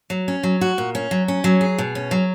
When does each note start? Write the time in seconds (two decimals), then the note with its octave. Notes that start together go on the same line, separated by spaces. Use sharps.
0.10 F#3
0.28 C#4
0.43 F#3
0.61 F#4
0.78 A#2
0.95 C#4
1.11 F#3
1.28 C#4
1.44 F#3
1.61 G#4
1.78 B2
1.95 C#4
2.11 F#3